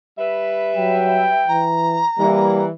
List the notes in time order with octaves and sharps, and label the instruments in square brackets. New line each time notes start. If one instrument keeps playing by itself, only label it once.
[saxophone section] G3 B4 E5
[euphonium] F#3 [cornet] G5
[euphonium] E3 [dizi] A#5
[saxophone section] E3 [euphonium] G3 [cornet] A#3